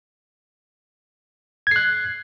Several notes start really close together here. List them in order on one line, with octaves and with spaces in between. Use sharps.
G#6 C7 F#6